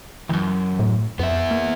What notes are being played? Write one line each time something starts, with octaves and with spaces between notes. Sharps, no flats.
C2 F#2 E3
A2
F2 B3 E5
A#3